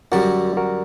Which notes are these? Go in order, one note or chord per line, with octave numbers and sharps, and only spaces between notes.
F#2 D3 G3 F#4 A#4
F#4 A#4